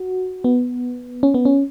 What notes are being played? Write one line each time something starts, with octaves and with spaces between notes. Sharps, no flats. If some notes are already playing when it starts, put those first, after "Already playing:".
Already playing: F#4
B3
C#4
B3
C#4